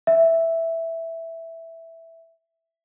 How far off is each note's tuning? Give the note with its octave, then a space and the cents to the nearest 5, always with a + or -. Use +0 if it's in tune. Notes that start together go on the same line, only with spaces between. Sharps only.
E5 +0